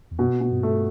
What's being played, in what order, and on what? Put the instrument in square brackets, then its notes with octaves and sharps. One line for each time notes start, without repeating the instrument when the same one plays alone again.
[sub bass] E2
[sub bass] F#2 [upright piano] B2
[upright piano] B2
[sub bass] G2
[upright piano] A3